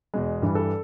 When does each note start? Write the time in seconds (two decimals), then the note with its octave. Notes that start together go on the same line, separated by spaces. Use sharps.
0.14 E2 B2 G#3
0.42 G2 E3 G3
0.55 A4